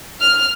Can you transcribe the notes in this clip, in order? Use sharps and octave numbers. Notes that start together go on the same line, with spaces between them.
F6